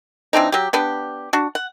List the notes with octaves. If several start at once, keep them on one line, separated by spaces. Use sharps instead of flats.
E3 C4 D4 D#4
F#3 G4
B3 D4 G4
D4 F#4
F#5